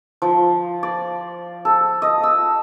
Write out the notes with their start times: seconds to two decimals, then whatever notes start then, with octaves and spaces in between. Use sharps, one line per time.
0.22 F3
0.83 D5
1.65 A4
2.02 D#5
2.23 E6